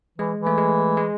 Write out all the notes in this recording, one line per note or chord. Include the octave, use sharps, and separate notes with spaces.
E3 G#3
E3
A3
G#3
G#3